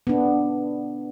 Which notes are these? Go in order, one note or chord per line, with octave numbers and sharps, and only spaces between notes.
B3 D4